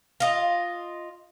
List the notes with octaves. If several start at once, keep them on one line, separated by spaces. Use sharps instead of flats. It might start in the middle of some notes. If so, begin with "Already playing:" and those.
F4 D#5